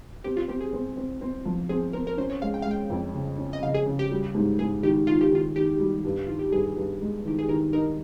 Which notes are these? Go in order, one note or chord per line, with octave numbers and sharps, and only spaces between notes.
C4 G4
F4
C4 G4
G#4
C4
C4
C4
F3
C4 G#4
C4 A#4
A#4
C#4 C5
C#5
G#3 F5
G5
G#3 F5
G5
F2
C#3
C#4
D#5
C#3 F5
G#4
C#3
G4
G3
G#2
G#2 G#4
D#3 G4
D#3 F4
G4
D#3 F4
D#3 G4
G3
G2
D#3 F4
G4
G2 G#4
G2
G#3
D#3 G4
G#4
D#3 A#4
D#4 A#4